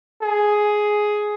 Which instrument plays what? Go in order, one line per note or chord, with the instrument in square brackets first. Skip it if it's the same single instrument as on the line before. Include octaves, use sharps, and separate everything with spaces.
[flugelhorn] G#4